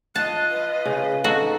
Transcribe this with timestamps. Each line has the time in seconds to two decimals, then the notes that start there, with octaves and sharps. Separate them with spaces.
0.16 F4 D#5 A5 F#6
0.51 B4
0.86 C#3
1.24 D#4 F#4 A4